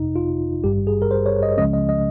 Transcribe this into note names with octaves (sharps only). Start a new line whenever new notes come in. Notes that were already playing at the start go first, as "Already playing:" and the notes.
Already playing: G1 F2 C3 D#4
F4
G#1 G2 G3 G4
G#4
A#4
C5
C#5
D#5
C#2 C#3 F3 G#3 C#4 D#5
D#5
D#5